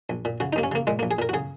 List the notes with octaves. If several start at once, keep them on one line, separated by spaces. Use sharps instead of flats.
A#1
A#2
C#3 F#4
D#4
D#2 A#3
C#4
C#3 A#3
A#2 G#3
A#3
A#1
G#4
A#2 A#4
F#4
C#3 G#4